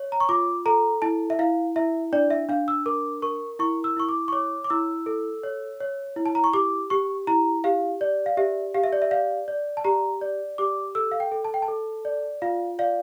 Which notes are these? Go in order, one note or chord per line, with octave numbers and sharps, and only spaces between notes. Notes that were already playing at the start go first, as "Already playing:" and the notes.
Already playing: C#5
A#5
C#6
F4 D6
A4 A#5
E4 A5
E5
E4 F5
E4 E5
D4 D5
E5
D4 F5
E6
A#4 D6
A#4 C#6
E4 C#6
E6
E4 C#6
D6
C#6
C#5 D6
D6
E4 E6
A4
C#5
C#5
E4
A5
A#5
C#6
G4 D6
G4 C#6
E4 A#5
G4 F5
D5
F5
G4 E5
G4 F5
E5
D5
E5
D5 F5
D5
A5
G4 A#5
D5
G4 D6
A4 E6
F5
G5
A4
A5
G5
A5
A4
D5
F4 F5
D5 F5